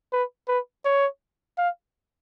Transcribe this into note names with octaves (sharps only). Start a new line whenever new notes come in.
B4
B4
C#5
F5